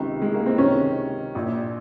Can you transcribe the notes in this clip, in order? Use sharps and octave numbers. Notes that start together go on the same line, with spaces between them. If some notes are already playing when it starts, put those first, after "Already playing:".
Already playing: C#2 C3 D#3
G#3
A#3
C4
C#2 C3 D#3 C#4
A#1 A#2